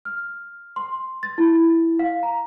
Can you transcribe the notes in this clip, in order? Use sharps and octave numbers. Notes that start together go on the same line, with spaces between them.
F6
C6
A6
E4
F5
A#5